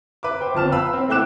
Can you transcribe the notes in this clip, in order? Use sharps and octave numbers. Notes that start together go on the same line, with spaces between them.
B4 E5 D6
C5 G5
G1 F2 A5 F6 E7
B4 F5 B5 E6
C4
A3 E4 G5 D6 F#6 E7